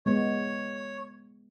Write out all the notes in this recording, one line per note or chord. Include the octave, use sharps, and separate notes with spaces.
G#3 B3 B4 C#5